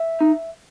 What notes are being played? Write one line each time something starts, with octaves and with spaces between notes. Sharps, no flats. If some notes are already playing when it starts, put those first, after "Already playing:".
Already playing: E5
D#4